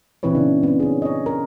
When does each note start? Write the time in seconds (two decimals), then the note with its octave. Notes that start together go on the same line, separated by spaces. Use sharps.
0.23 A#2 E3 C4 E4 B4 C#5
0.35 C#3 D4
0.63 B3 C4
0.80 C#4 D4 G#4
1.02 C#5 D#5
1.26 A#4